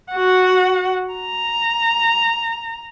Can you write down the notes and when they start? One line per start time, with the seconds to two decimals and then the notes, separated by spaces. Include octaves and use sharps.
0.12 F#4 F#5
1.14 A#5